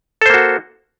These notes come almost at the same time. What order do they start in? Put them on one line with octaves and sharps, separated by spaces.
A4 C5 A#3 F#4